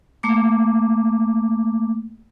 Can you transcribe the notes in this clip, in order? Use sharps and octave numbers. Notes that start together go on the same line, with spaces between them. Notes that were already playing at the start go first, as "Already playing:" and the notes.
A3 A#3 D6